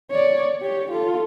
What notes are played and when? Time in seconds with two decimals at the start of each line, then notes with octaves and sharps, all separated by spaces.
0.11 C#5 D5
0.62 G4 C#5
0.91 F4 A4